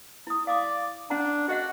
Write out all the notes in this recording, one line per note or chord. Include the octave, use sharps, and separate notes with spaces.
E4 D#6
D5 F5 D6
C#4 D4 F#5 A#5
F#4 G#4 D#5 F#5